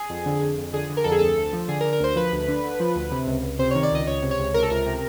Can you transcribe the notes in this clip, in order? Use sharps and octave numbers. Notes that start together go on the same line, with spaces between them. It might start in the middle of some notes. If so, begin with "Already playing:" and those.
Already playing: G#4
F2
D3
F2
F2
D3 G#4
D3
A#4
F2 A4
G#4
D2 A4
D2
F3
D3 G#4
A#4
D3
A#4
D2 C5
F3 B4
D2
D3
D3
F3
D2
C3
C#2
C#2
C3 C5
C#5
D#3
D5
C#2 D#5
C#2 C#5
C3
C#5
C#2
C3 A#4
A4
C#2 A#4
C3